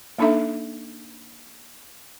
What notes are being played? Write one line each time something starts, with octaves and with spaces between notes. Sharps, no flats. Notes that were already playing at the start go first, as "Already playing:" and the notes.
A#3 D4 D#4 A4 E5 A#5